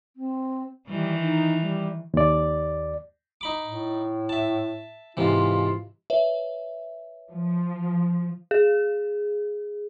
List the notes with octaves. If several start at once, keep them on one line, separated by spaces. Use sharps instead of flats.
C4
D#3 E3 G3
D#4
G3
D#2 D5
D#4 B5 D6
A2
E5 A5
G#2 C3 E3 F4
B4 C#5 E5
F3
G#4